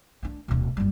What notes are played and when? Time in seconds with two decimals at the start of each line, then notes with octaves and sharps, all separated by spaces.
0.23 A3 D4
0.48 D1 B2
0.77 F#1 G3